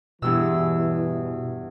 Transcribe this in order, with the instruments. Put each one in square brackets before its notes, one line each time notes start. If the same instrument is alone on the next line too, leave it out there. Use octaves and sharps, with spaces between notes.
[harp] E2 G2 E6 [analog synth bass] B2 [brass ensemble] E3